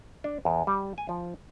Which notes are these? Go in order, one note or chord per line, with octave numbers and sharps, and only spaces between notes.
D4
E2
G3
G#5
F3